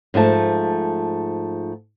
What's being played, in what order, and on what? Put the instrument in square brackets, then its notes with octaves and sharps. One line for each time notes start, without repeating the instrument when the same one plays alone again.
[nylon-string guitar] G#2 F3 A3 A5